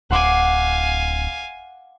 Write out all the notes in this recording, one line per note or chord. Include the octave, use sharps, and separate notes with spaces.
D1 F5 F#5 G#5 C6 D6